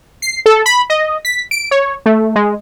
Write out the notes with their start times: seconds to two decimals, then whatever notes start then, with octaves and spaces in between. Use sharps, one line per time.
0.22 C7
0.46 A4
0.66 B5
0.90 D#5
1.25 B6
1.51 D7
1.71 C#5
2.06 A3
2.36 G#3